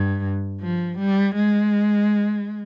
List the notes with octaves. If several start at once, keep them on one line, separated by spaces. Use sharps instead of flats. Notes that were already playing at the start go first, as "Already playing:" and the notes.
Already playing: G2
F3
G3
G#3